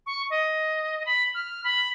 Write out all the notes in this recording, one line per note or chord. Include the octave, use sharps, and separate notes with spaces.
C#6
D#5
B5
F6
B5